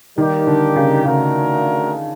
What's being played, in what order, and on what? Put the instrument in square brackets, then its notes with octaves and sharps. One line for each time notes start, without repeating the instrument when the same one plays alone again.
[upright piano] D#3 [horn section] G3 A#3 D#4 G4 A#4
[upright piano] D3
C#3
[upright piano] C#3 [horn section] A3 D4 F#4 A#4